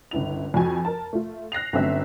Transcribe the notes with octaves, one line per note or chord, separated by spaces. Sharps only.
G1 C#2 E4 F7
F2 F#4 G#5
A#4 A5
A3 F4
F#6 A#6 C7 F7
G1 F#3 A3 C4 C#4 E5